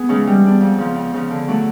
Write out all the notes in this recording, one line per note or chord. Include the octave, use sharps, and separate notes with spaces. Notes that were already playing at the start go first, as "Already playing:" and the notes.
Already playing: B3 G#4
C#3 E3 G#3 C#4
G3
B3 D4
F2
C#3 F3
F2
C#3 F3
D3
F#3 A3 D4 F#4